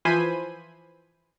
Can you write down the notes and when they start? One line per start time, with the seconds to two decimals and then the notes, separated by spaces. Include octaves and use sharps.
0.05 E3 F3 C5 G#5 B5 D#7